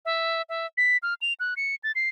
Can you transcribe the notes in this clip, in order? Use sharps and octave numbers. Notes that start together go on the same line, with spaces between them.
E5
E5
B6
F6
F7
F#6
C#7
A6
C7